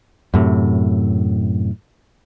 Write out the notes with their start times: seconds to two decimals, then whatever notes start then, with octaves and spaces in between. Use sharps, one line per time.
0.34 F#2 A2 C3